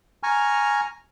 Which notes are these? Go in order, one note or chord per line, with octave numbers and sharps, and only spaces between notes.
G#5 A#5 C#6 F6